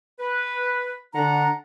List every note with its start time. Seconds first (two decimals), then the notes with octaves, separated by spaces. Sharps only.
0.20 B4
1.14 D3 D4 F#5 A#5